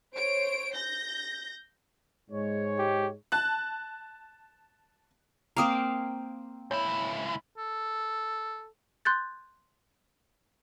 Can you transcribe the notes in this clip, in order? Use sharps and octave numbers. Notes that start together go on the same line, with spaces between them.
C5 C#5 D7
G6 A#6
G#2 G#3 C#5
G4
A5 F#6
A#3 C4 F5 A#5 D6 D#6
C#2 E4 C#5
A4
C6 F#6 G6 A6